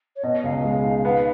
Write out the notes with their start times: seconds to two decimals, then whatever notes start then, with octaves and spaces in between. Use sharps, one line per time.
0.16 C#5
0.23 B2 D#5
0.43 C#2 F5
0.63 G#3 F5
0.84 D#4
1.04 B3 F5